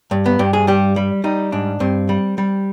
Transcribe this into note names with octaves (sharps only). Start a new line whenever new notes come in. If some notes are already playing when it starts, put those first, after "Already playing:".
G2
B3
G2 G4
G#4
G3 G4
G3
G3 D#4
G#2 D4
G2 C4
G3
G3